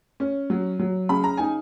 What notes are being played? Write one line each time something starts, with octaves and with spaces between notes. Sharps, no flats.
C#4
F#3
F#3
C#3 B5
A#5
D#4 G#5